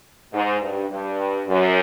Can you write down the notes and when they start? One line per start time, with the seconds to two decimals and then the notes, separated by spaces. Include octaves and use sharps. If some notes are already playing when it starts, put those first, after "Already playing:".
0.32 G#2
0.61 G2
0.90 G2
1.48 F#2